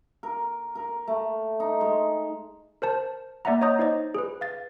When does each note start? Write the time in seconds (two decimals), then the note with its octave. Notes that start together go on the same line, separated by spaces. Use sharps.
0.23 A#4
0.75 A#4
1.07 A3
1.60 D#4
1.81 G#3
2.82 A#4 C5 A5
3.45 A#3 D5 E5 F#5 A#5
3.61 C#5 D#5 F#5 A#5 D#6 G6
3.79 D#4 C5 D5 D#5
4.15 G#4 B4
4.41 F5 A6